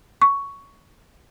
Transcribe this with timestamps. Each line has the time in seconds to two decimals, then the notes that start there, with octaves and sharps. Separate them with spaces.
0.22 C#6